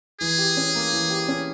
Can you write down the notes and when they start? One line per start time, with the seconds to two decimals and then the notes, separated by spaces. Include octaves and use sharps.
0.21 E3 G#4
0.38 G4
0.57 C#4
0.75 A#3
0.93 E3
1.10 G4
1.28 C#4